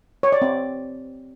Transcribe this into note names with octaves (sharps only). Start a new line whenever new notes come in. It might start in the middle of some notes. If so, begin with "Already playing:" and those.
C#5
D5
C4